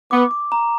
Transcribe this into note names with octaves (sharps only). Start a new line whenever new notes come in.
B3 D6
D6
A#5